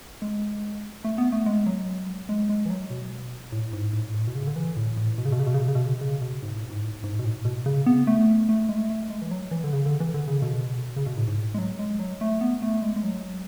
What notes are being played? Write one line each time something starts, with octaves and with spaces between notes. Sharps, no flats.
G#3
A3
B3
A3
G#3
F#3
G#3
G#3
E3
F#3
B2
A2
G#2
A2
A2
B2
C#3
D3
E3
A2
A2
B2
C#3
B2
C#3
B2
C#3
B2
C#3
B2
C#3
B2
G#2
A2
G#2
A2
G#2
B2
A2
B2
C#3
B3
A3
A3
G#3
A3
A3
G#3
E3
F#3
E3
D3
C#3
D3
E3
D3
C#3
B2
C#3
B2
A2
G#2
G#3
F#3
G#3
F#3
A3
B3
A3
G#3
G#3
F#3